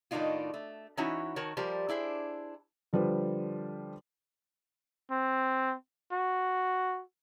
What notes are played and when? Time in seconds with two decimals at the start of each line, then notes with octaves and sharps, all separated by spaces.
0.11 A2 D#3 D4 D#4 F4 F#4
0.54 A3
0.97 E3 C#4 D#4 E4 F#4 C#5
1.36 D#3 F#4 A#4 C#5 A5
1.57 F3 G3 G4 A#4 C5
1.88 D4 E4 G#4 C5
2.93 D3 F3 G3 B4
5.11 C4
6.12 F#4